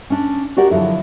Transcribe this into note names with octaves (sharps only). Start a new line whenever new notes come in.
C#4 D4
F#4 G4 A#4 D5 F#5
D3 F3 F#3 E4 A4